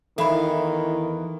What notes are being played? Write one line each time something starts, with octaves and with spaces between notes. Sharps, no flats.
E2 D#3 E3 E4 A4 C#5 F5 B5